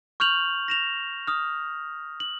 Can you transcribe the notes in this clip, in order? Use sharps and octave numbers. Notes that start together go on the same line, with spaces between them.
C#6 F6 G6 F7 F#7
A#6 E7 F7
D#6 F6
F#7